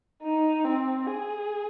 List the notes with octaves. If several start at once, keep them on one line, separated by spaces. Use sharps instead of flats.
D#4
C4
G#4